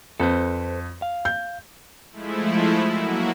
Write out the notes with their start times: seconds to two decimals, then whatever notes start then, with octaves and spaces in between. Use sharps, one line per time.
0.20 F2 A4 B4 C5
1.02 F5
1.25 G6
2.12 F3 G#3 A3 E4
2.89 F#3 A#3 E4 F#4